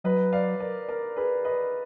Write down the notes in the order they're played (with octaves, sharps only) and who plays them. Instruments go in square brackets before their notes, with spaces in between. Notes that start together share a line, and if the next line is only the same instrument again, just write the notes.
[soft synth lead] F#3 [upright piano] B4 D#5
[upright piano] D5 F5
A#4 D5
A#4 D5
G#4 B4
B4 D#5